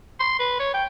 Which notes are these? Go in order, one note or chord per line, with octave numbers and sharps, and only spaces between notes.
C6
B4
C#5
G5